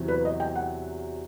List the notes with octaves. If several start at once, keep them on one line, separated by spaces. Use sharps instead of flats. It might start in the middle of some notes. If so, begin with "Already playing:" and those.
Already playing: E2 C3 F#3
B4
D#5
G5
F#5